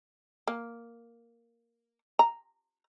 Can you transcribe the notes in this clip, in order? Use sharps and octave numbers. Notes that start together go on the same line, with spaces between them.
A#3
A#5